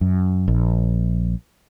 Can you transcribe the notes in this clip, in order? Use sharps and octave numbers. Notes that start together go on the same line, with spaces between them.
F#2
A#1